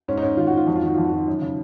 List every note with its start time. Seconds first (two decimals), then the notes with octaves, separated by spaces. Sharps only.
0.08 G#2 C#4
0.17 D#4
0.22 G#2 C#4
0.37 D#3 F4
0.47 F#4
0.52 G#2
0.57 F4
0.66 F2 F#4
0.76 F4
0.83 D#3 F#4
0.94 F2 F4
1.04 F#4
1.12 D#3 F4
1.28 F#2
1.42 C#3